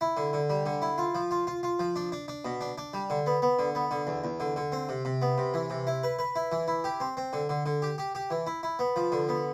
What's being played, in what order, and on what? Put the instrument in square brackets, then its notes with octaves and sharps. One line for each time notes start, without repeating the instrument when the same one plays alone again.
[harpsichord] E4
D3
D3
G3
D3
E4
F4
F3
F4
F4
F4
F3
D4
D4
D4
B2
D4
D4
G3
D3
B3
B3
D3
B3
D3
E2
E2
D3
D3
C4
C3
C3
B3
C3
E3
C3
E4
B4
B4
E4
E3
E4
G4
C4
C4
D3
D3
D3
G4
G4
G4
E3
E4
E4
B3
F3
D3
B3